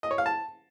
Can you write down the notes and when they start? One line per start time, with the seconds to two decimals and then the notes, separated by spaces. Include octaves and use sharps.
0.03 D#5
0.11 C#5
0.18 F5
0.26 A5